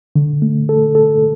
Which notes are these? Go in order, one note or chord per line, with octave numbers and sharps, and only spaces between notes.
D3
A3
A4
A4